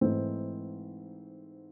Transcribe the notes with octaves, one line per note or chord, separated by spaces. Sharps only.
G#2 E3 A3 C4 D#4